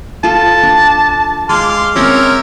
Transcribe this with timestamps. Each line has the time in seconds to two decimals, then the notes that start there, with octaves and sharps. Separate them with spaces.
0.24 F4 A4 A5
0.63 D4
1.49 G#3 F5 C6 D6
1.96 C4 C#4 A#4 C#5 D5 E5